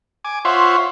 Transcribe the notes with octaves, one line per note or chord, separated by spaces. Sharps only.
G#5 D6
F4 C5 C#5 E5 F#5